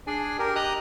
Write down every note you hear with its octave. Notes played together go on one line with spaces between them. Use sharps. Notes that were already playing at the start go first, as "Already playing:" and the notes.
D4 G#4 D5 G#5
G4 A#4
G4 D#5 A#5 D#6 F#6